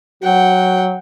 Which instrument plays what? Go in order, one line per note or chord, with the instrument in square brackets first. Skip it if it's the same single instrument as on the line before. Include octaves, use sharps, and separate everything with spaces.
[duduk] F#3 [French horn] F#4 [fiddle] F#5 G5